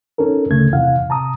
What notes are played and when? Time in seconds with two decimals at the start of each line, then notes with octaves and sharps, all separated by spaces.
0.18 C#4 D#4 A4 A#4
0.51 D2 C#3 A3 G#6
0.73 E2 C3 E4 F5 F#5
1.09 C3 A5 A#5 D#6